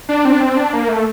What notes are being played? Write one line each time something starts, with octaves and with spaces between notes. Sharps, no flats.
D4
C4
D4
C4
D4
A#3
A3